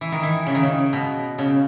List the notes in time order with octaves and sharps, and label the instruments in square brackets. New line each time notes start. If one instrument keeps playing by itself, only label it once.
[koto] E3
D#3
E3
C#3
D#3
C#3
B2
C#3